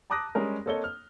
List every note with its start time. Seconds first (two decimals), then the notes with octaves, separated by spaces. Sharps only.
0.10 A5 A#5 D6 D#6 F#6 A#6
0.35 G3 G#3 C#4 A#4
0.66 A#3 C4 A4 C#5 D#5 G7
0.84 F6